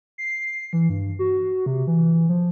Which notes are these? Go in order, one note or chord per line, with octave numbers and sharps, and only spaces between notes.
C7
E3
G2
F#4
C3
E3
F3